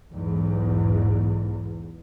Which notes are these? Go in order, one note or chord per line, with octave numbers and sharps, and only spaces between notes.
B1 E2 G#2